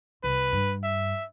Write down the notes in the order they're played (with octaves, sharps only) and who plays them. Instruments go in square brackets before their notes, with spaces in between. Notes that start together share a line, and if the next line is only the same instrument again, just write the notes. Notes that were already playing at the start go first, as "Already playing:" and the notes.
[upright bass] C2 [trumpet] B4
[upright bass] G2
[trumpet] E5